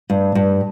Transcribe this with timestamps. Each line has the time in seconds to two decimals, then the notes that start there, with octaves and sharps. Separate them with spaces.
0.10 G2
0.35 G2